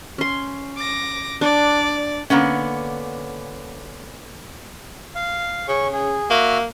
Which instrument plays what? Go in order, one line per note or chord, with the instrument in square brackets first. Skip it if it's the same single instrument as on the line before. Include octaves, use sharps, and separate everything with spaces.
[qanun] C#4 C6
[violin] D6 A#6
[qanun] D4 [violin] D5
[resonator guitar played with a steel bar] D3 A#3 B3 C#4
[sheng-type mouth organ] F5
[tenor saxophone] C#3 [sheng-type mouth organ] C#4 C#6
[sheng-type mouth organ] G#4
[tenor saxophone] A#3 [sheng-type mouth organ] F#4 E5 F6